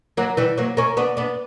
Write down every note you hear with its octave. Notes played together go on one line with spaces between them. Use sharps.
F#3 A#3
E3 G3
F#3 A#3
A#3 C#4
B3 D4
B3 D4